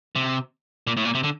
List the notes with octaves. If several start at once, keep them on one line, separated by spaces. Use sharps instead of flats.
C3
A#2
A2
A#2
C3
D3